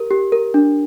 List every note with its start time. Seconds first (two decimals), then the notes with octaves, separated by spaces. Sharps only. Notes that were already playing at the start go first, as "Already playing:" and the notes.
Already playing: G4 A#4
0.11 G4
0.32 A#4
0.54 D4